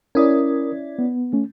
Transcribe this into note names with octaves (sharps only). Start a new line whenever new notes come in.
C#4 E4 A#4 D5 D#6
B3
A3 C#4